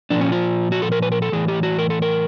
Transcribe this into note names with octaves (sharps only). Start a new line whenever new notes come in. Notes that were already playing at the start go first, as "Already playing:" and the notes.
A#2 F3 D4
C#4
F4
F#4
A4
A#4
B4
A#4
A4
A2 E3 G#4
G4
F#4
A#4
A4
A#4